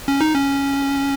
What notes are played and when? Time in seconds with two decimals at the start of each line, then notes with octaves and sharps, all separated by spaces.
0.08 C#4
0.21 D#4
0.34 C#4